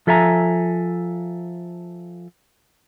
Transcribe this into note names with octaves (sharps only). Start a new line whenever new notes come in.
F3 A4 E5 G#5 A#5